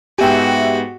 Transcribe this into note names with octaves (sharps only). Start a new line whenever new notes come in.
G#2 B3 F#4 G4 E5 G5 G#5